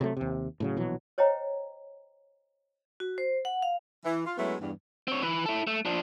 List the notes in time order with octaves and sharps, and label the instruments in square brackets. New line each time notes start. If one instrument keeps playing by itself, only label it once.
[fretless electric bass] C3 F#3 A3
D#2 C3
A2 C#3 F#3
A#1 B2 E3 F#3
[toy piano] C5 C#5 D#5 G5 A#5
[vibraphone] F#4
C5
F#5
F5
[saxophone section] E3
F4
F#3 G#3 A3 B3 C#4 E4
E2 G2
[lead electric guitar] C4 C#5
E3 B4
E4 A4
A3
F3 D4